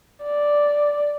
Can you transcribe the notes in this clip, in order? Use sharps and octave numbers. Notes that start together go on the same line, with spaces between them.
D5